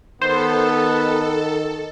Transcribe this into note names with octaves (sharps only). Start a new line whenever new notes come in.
D#3 B3 A4 C5